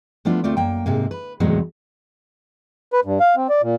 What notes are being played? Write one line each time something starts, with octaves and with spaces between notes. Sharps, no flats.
F3 A3 B3 D4 F4
D2 A3 C4 F4 D5
F#2 A#3 G5
G#2 C3 A#3
B4
E2 A2 C3 F#3 G#3 B3
B4
G2
F5
C4
D5
A#2